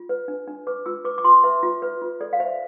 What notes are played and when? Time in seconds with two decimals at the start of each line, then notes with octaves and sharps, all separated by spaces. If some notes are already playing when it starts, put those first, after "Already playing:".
Already playing: F4
0.09 B4
0.28 D4
0.47 D4
0.67 B4 D6
0.86 F4 E6
1.05 B4 D6
1.18 D6
1.24 F4 C6
1.43 B4 E5
1.63 F4
1.82 B4
2.02 F4
2.21 A4 D5
2.33 F5
2.40 C5 E5